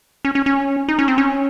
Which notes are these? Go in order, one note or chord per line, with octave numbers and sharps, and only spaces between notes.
C#4
C#4
C#4
D#4
C#4
C4
C#4